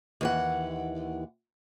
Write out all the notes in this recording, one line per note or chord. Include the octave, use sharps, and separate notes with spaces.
D#2 E3 F#5